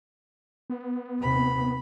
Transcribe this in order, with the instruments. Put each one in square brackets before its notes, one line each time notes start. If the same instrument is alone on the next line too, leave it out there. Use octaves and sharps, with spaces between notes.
[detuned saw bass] B3
[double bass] D#2 C3 [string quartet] B5